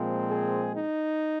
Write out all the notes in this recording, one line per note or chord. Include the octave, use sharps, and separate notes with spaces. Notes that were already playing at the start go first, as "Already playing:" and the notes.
Already playing: A#2 F3 G#3 C4
G#4
D#4